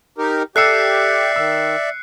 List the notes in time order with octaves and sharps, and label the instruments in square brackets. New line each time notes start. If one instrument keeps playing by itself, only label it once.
[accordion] D#4 G4 A#4
[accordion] G4 [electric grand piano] A4 E6 [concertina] D5 E5 [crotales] F#6 C7 C#7
[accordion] D#3 [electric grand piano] E6